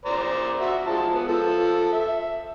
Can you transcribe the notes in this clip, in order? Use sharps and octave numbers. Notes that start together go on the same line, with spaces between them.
C5 D5 A#5
F#4 E5
F3 G#3 A5
B3
F3 A4
E5